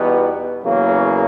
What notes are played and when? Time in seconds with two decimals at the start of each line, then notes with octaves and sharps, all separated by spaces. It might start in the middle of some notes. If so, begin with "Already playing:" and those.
Already playing: E2 B2 G3 B3 D#4
0.61 E2 C#3 F#3 A#3